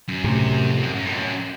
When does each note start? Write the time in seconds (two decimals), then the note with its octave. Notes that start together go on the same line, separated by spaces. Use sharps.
0.08 F#2
0.24 A2 C3
0.70 F2
0.83 F#2
0.95 F#2
1.06 A2
1.13 F2
1.18 F#2